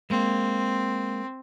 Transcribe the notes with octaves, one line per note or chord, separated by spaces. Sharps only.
G#3 A#3 C4